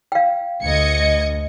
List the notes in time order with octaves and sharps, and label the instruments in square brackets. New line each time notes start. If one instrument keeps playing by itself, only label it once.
[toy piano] F5 G5
[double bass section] D2 [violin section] D#5 G#6 C#7